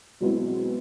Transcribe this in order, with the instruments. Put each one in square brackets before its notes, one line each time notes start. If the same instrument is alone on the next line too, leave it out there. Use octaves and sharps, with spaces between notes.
[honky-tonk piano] B2 F#3 G#3 B3 C4 E4